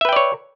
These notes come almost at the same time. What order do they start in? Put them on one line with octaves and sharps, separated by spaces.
E5 B4 G5 D5 C#5